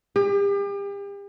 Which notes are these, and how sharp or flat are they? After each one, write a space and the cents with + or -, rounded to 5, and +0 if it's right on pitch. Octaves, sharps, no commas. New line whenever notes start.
G4 +40